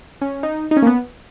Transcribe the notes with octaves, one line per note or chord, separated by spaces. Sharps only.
C#4
D#4
D#4
C#4
A#3
B3